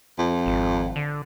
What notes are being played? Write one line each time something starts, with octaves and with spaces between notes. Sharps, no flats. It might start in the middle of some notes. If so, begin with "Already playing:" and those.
F2
G#1
D3